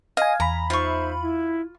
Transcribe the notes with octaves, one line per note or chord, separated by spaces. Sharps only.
D#5 F5 G#5
E2 A#5 B5
D#4 F4 C5 E5 C#6
E4